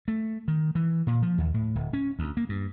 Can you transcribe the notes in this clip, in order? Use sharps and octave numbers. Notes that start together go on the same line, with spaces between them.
A3
D#3
E3
A#2
F3
D#2
A2
D1
C#4
D2
A#3
G2